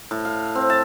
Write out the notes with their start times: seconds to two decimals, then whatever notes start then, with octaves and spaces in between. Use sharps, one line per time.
0.11 A2
0.25 F5
0.55 C4
0.70 A5